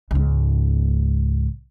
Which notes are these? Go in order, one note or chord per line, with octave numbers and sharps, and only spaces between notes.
C#2 G#2